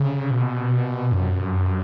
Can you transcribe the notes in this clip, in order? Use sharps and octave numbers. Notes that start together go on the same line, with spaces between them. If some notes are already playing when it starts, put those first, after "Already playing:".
Already playing: C#3
B2
F#2